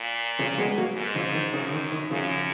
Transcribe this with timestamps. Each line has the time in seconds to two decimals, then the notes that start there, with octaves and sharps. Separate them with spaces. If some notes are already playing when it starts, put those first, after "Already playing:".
Already playing: A#2
0.39 C#3 F3
0.58 G#3 B3
0.78 F#3 A#3
0.96 G#2
1.15 C#3 F3
1.35 D#3
1.53 F#2 C#3
1.73 D#3
1.92 D#3
2.11 F#2 C#3 F3